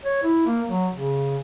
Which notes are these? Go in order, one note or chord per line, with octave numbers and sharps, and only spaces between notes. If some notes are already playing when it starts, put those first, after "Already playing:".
C#5
E4
A#3
F#3
C#3